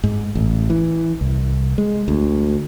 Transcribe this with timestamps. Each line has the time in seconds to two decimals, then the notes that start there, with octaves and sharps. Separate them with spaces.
0.04 G#2
0.35 A1
0.70 E3
1.21 C2
1.78 G#3
2.08 D2